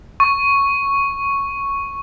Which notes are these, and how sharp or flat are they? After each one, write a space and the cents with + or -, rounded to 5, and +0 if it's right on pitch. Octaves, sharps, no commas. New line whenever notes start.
C#6 +0